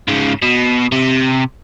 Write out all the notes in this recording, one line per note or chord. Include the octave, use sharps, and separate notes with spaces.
G#2 C#3
B2
C3